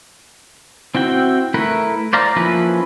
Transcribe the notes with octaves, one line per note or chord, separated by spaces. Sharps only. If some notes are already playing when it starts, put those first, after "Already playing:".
C4 E4 F#4 G5
A3 E4 A#4 B4
C5 D5 F5 A#5
F3 A#3 C#4 E4 B4